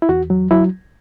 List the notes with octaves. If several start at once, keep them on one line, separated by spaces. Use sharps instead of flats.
E4
E2 F#4
F#3
F#3 E4